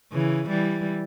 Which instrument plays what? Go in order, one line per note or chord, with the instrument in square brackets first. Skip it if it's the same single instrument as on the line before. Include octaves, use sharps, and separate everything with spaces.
[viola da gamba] C#3 E3
E3 G3